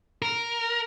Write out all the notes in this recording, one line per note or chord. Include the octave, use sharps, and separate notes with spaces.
A#4